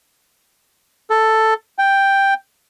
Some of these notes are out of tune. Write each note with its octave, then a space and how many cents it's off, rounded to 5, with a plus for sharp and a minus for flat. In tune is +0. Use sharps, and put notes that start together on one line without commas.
A4 +5
G5 +5